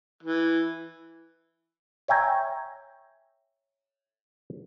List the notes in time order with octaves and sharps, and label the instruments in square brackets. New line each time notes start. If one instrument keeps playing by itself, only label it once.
[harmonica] E3
[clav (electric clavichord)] C#5 E5 G5 G#5 A#5